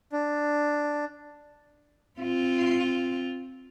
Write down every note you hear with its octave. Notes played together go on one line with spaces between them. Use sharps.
D4
C4 F4